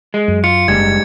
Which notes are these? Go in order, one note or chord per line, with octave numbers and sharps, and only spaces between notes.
G#3
F#2
F4 C#7
F#1 G#2 G3 G#6